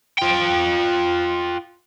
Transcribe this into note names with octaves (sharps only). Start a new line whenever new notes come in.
F4 G5